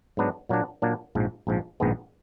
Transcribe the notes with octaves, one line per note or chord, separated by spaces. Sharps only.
G#2 F#3 B3 D4
A#2 F#3 A#3 D4
A#2 F#3 A#3 D4
A#1 G#2 F3
A#1 G#2 F3
A#1 G#2 D#3 G#3 B3